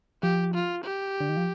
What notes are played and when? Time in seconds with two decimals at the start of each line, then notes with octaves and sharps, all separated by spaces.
0.23 F3 G4
0.54 F4
0.84 G4
1.20 D3
1.29 D#3
1.37 F3